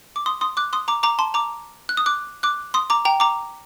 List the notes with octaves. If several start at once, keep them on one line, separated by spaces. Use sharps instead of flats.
D6
C6 D#6
C6 D#6
D6 F#6
C6 D#6
A#5 D6
A#5 D6
A5 C6
A#5 D6
F#6
D#6
D6 F#6
D6 F#6
C6 D#6
A#5 D6
G5 A#5
A#5 D6